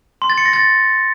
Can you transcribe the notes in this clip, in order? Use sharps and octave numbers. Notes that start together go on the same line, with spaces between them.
C6
A6
C#7
A#6
A6